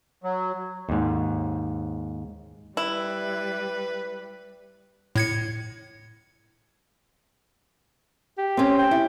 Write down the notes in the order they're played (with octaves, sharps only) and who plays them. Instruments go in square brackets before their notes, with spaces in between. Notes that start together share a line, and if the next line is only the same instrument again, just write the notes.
[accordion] F#3
[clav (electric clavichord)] D#2 G#2
[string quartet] G3 [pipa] E4 [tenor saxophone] B4
[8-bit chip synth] A2 G#6 C#7
[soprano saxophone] G4
[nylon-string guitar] C4 C#4
[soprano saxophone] G5
[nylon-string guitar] E4